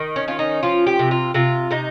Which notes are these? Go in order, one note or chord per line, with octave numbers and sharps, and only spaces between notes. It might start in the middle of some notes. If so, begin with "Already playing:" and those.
Already playing: D#3
C#4
C#4 F4
D#4
F3 F4
G4
C3
F4
C3 F4
C3 D#4